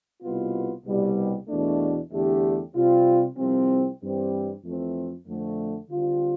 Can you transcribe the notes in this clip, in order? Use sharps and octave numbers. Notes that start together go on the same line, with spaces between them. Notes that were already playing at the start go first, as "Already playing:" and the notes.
C2 B2 B3 F4
C2 B2 G3
E2 B2 A3 D4
E2 D3 A3 D4 G4
C3 G3 C4 F4
C2 C3 F3 C4
G2 E3 G3 C4 G4
F2 E3 A3 C4
F2 D3 A3
D3 G3 C4 F4